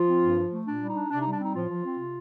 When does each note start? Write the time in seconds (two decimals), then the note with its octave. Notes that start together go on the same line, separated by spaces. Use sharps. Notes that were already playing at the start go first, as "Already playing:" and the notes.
Already playing: F3 F4
0.08 C4
0.22 G2
0.37 F3
0.52 A3
0.66 A#2 D4
0.82 G3
0.89 D#4
0.96 D4
1.10 C3 D4
1.22 G3 D#4
1.33 D4
1.40 C4 D#4
1.55 A2 F3 F4
1.69 F3
1.84 C4
1.99 C3